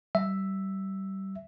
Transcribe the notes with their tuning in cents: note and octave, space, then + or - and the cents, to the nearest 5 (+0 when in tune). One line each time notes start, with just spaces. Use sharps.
G3 -25 E5 +0